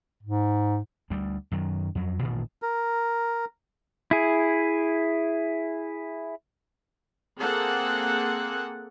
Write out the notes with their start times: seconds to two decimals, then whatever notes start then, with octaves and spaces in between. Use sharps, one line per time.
0.23 G#2
1.10 D2 G3
1.52 F#2 D#3 F#3
1.95 F2 F#3
2.22 A1 G2 A#2 D#3
2.62 A#4
4.11 E4 G#4
7.39 A#3 C4 G#4 A4 F#5